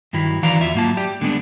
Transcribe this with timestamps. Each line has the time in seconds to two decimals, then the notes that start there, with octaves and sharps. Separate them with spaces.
0.13 G2 D#3 F#3 E4
0.43 D#3 E3 F#4 D5 F5 A#5
0.61 E2 F4 E5
0.74 G#2 F#3 A#3 F4 A5
0.97 G4 D5
1.21 D3 G3 G#3 B3 D4